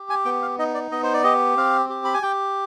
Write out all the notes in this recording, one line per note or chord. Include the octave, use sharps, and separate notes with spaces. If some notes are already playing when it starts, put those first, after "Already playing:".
Already playing: G4
G#5
B3 G5
F5
D#4 D#5
D5
B3 D#5
C5
D5
G4 D#5
C4 F5
G4
B5
G#5
G4 G5